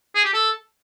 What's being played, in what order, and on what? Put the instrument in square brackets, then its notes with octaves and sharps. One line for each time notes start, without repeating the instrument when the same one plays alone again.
[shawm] G#4
G4
A4